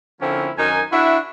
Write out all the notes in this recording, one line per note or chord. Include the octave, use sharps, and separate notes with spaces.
D3 F3 A#3 C4 C#4 E4
F#2 D#3 D#4 A#4 G#5
D4 E4 F#4 E5